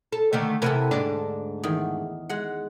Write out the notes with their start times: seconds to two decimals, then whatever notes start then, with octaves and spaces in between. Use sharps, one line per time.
0.12 A4
0.33 D3 D#3 A3
0.62 C3 E3 A4 A#4 F#5 G#5
0.91 D2 G#2 D4
1.63 E2 D#3
2.29 G#3 F#5